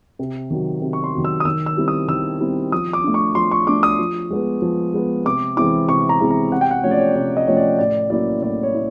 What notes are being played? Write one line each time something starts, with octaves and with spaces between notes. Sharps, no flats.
C3
D#3 F#3
C3
C#6
C6
D#3 F#3
E6
D#6
D#3 E6
E6
G3 C4 E4
D#6
D#3 E6
G3 C4 E4
F3 D#6
D6
A3 D4
C#6
F3 C6
C#6
A3 D4 D6
D#6
F3
G#3 B3
F3
G#3 B3
C3 D6
E3 G#3 C4 E4 D6
C3 C#6
A#5
E3 G#3 C4 E4
A#5
C3 F#5
G5
F#5
F3 A3 C#4 C#5
D5
C#5
C3 D5
D#5
F3 A3 C#4 C#5
D5
A2 D5
F#3 A#3 C#4 E4 D5
A2 D5
C#5
E4